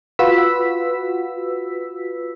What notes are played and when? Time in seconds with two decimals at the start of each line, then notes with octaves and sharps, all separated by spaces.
0.19 F4 F#4 B4 E6 B6